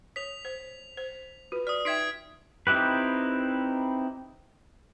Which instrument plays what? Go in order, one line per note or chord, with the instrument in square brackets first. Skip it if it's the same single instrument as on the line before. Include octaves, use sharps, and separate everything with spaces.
[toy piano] C#5 D#6 [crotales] B6 F7
[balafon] C5
C5
[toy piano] F4 B4 [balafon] F#4
[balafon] D5 [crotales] D#6 F6
[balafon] D#4 E5 G5 [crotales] G#6 B6 D7
[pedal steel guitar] C4 D#4 E4 G4 B4